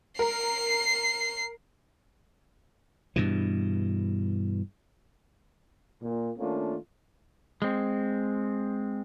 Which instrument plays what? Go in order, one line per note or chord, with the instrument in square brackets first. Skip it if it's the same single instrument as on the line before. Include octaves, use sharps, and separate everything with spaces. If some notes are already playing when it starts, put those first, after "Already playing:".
[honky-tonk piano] A#4 [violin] C7
[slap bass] G2 B2 E3
[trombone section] A#2
D#3 A3 A#3 C#4 D4 F4
[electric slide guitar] G#3 C4